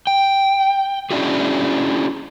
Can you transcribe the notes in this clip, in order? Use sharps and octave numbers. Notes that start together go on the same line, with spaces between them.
G5
C#4 D4 E4 F#4 G#4